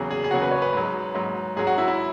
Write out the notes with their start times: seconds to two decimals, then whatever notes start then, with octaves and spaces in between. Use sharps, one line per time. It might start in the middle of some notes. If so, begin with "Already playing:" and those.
Already playing: E2 C#3 F#3 G#4
0.11 G#4
0.24 G#4
0.31 E2 C#3 F#3 F#4
0.42 B4
0.51 C#5
0.62 B4
0.73 G#2 F#3
1.15 G#2 F#3
1.56 G#2 F#3 G#4
1.67 F#4
1.78 E4
1.88 E4